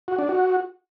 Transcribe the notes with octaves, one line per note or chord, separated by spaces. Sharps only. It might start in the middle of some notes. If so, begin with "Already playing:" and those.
F#4
D4
F#4